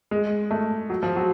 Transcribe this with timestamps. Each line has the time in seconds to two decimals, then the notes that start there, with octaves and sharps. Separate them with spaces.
0.11 G#3
0.51 A3
0.90 F#3
1.03 F3
1.16 F#3